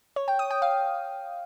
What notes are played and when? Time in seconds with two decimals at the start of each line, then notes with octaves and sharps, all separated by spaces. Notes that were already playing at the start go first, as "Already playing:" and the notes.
0.16 C#5
0.28 G5
0.39 D#6
0.51 G5
0.62 F5